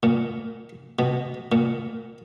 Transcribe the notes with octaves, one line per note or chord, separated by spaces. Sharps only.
A#2
B2
A#2